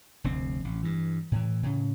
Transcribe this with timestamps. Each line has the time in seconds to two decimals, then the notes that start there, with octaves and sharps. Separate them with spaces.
0.24 F1 D2 C4
0.64 A1
0.83 G2 E3
1.32 A2 E3
1.63 A2 C#3